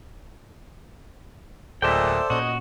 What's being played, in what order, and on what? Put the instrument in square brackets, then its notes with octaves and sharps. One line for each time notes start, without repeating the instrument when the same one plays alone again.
[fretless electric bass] D1 [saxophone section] A#2 G#3 [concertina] A4 C5 D5 [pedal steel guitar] E5 G5
[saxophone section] E2 D#5 [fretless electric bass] A#2 C#4 [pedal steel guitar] F#4